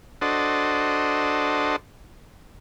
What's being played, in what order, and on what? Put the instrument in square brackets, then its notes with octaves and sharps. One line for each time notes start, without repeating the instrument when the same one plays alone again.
[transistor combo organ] D4 F#4 A4 C5 D#5